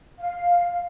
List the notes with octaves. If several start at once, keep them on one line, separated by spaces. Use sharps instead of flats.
F5